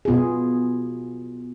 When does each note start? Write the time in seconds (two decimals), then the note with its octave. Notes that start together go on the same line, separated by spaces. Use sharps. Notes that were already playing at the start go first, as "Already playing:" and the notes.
0.05 B2 B3 F4 G#4